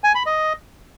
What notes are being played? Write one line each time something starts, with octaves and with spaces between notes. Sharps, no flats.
G#5
B5
D#5